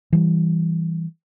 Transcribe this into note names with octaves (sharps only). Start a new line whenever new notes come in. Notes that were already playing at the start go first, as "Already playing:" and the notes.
E3 G3